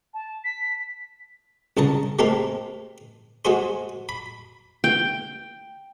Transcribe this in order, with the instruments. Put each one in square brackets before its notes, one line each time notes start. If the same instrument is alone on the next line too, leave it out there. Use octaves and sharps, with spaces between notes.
[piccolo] A5
B6
[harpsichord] C2 C#3 A5 A#5
G#3 A3 C4 G4 A4 A#4
G#3 F#4 G#4 C5
B5
[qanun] G5